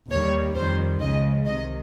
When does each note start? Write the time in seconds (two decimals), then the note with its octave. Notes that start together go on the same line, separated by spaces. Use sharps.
0.11 D#2 D#3 G3 C#5
0.55 F2 D#3 G3 C5
1.01 C#2 C#3 F3 G#3 D#5
1.46 C2 C3 D#3 D#5